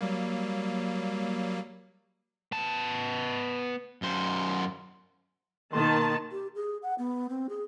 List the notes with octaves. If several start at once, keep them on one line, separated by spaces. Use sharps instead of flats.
F#3 G3 A#3
B3 A5
F#2 C5
B2 D#3 A#3 A5 C6
G4
G#4
F#5
B3
C4
G#4